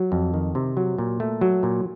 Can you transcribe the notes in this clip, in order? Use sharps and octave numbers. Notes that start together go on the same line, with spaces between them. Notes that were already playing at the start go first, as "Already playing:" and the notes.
Already playing: F#3
F2
D#3
C3
F#3
A#2
A3
F#3
A#2